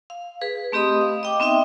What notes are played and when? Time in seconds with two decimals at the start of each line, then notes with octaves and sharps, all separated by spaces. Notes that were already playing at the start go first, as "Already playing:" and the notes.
0.10 F5
0.41 G#4 B4
0.72 A3 C4 G4 D#5 B5 D#6
1.01 F5
1.23 D#5 G5 D6
1.40 B3 C4 D#4 D#5 E5 G5